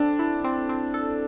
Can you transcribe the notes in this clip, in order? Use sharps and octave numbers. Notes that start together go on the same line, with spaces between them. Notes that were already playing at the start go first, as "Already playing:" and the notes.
Already playing: C4 D4 A4
E4
C4
C4
A4